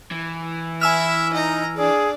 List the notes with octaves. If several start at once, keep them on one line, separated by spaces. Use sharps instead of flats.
E3
E4 E5 G#5 E6 F6
D#4 D#5 A#5
D4 G#4 D5